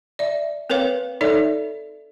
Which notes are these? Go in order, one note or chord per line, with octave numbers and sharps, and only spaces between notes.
D5 E5
C4 A#4 B4 C#5 F5
D#4 A4 C#5 D5 E5